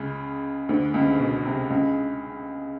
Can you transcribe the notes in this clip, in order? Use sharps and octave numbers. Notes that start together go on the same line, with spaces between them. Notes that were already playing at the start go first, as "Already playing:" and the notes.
Already playing: C#2 C#3
D2 D3
C#2 C#3
B2
C3
C#2 C#3